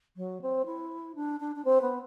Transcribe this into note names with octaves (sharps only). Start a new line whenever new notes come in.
F#3
C4
E4
D4
D4
D4
C4
B3